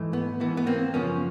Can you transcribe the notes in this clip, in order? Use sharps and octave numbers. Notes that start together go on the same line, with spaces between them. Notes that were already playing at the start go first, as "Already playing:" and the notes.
Already playing: G#2 E3 A3
B3
G#2 E3 A3 B3
B3
A#3 C4
F#2 C#3 F3 A#3 B3 C#4